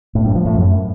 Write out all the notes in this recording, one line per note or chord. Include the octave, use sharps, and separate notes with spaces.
A2
G2
F3
A2
F#2